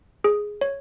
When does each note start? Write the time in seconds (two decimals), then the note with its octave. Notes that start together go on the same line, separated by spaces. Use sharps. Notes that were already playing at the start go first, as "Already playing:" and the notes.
0.24 G#4
0.61 C#5